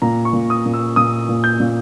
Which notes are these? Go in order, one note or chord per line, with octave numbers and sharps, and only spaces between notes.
A#2 A#5
C#6
A#2
D#6
A#2
E6
A#2 D#6
A#2
G6
A#2